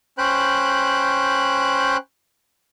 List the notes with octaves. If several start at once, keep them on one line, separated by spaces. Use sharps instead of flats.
C#4 C5 G5 B5 F#6